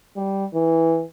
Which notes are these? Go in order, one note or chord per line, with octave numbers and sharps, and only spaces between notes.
G3
E3